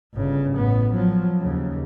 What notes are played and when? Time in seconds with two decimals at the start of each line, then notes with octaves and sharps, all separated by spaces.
0.15 G1 C#3
0.54 A1 B3
0.92 F3 F#3
1.39 D#2 C#3